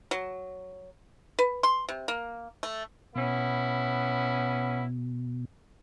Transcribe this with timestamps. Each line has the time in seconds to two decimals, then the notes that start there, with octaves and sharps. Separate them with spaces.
0.11 F#3
1.39 B4
1.63 C6
1.89 C3
2.08 A#3
2.63 A3
3.16 B2 B3 C#4 E4